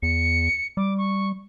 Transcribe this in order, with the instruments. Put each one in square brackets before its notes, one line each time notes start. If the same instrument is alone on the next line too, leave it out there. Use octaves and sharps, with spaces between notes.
[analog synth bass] E2 [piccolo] C#7
[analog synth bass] G3 [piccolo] D6
[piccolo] C#6